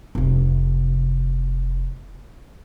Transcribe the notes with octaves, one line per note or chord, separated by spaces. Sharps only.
F1 C3